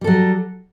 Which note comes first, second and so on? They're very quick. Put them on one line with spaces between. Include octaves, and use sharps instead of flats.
G3 A4 F#3